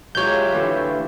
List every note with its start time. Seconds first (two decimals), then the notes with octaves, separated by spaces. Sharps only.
0.15 F#3 G#3 F4 G4 C#5 E5 G6
0.52 D3 E3 A3